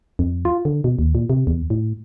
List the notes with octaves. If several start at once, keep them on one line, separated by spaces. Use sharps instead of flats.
F2
F4
D3
B2
D#2
A#2
C3
E2
A2